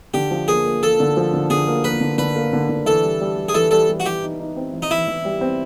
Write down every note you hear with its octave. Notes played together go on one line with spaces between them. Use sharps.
D3 G4
F3
A#3 G#4
A#3
A#3 A4
D3
F3
D3
D3 G#4
A#3
A#3 B4
D3
D3 B4
A#3
D3
D3
E3 A4
G3
G3
G3
G#4
E3 A4
G3 A4
G3
F#4
E3 G4
D#4
D#4
C4
E3
D#4
E3 E4
E3
G3
C4